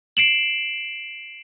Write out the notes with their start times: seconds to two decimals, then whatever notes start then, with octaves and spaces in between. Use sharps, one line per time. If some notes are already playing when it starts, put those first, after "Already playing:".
0.17 C7 D7 E7 F#7